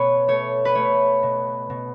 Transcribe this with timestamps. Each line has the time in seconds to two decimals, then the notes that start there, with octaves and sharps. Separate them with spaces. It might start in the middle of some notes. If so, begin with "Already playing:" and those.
Already playing: B2 A3 B4 C#5
0.28 A3 C#5
0.65 B4
0.75 A3 C#5
1.23 B2
1.70 B2